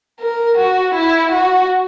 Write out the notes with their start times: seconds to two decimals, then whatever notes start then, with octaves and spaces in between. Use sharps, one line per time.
0.20 A#4
0.58 F#4
0.95 E4
1.32 F#4